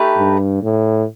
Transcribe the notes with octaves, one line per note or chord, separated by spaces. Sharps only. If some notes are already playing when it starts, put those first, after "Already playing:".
Already playing: A3 D#4 G4 B4
G2
A2